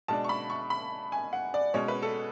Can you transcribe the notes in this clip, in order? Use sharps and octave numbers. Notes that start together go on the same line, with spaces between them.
B2 G#3 D4 A5
C#6
B5
C#6
B5
G#5
F#5
D5
B2 G#3 C#4 C#5
B4
A4